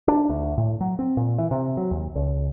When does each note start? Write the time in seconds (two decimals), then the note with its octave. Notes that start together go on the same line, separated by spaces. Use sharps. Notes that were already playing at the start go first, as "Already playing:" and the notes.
0.08 D4
0.30 D2
0.58 A2
0.81 F#3
0.99 C4
1.17 A#2
1.38 E3
1.51 C3
1.77 F#3
1.91 D#2
2.15 C#2